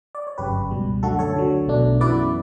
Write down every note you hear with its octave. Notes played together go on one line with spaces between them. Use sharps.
D5
C#5
G1 F#2 C#3 G4 B4
C#2 B2 G3
F#2 D3 A3 F#4 A4
A4 C#5
D2 D3 F#3
B1 B2 A3 D4
F#2 E3 B3 E4 B4 D5